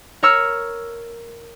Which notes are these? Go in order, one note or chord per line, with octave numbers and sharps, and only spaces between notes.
A#4 C#5 C#6 E6 F6